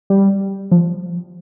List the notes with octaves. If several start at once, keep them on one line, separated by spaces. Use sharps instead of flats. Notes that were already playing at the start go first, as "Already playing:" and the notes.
G3
F3